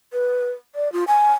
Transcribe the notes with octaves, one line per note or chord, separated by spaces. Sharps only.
B4
D5
F4
G#5